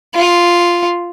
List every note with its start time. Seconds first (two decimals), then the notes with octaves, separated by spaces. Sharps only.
0.15 F4